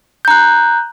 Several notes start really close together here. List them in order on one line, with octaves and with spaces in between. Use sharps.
G6 A#5 F#6